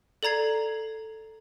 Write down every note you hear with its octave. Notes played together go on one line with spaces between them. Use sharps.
A4 D5 A#5 G#6 C7